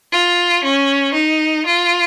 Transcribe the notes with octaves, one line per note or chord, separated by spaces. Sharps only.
F4
C#4
D#4
F4